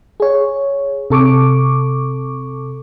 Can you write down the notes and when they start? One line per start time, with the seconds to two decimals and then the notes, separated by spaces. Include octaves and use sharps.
0.20 G#4 C#5
1.10 C3 A4 C#6 D6